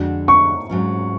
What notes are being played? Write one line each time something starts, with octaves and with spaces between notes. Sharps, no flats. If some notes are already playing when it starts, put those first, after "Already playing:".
Already playing: F2 D3 G#3 D4 F#4
C#6
G#2 F#3 C#4